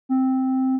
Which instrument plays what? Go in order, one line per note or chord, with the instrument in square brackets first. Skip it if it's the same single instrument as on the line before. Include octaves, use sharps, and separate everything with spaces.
[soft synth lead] C4